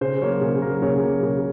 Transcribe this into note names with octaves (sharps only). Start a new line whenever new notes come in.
C#3 C5
F#3 A#3 C#5
C#3
F#3 A#3 A#4
C#3 C#5
F#3 A#3
C#3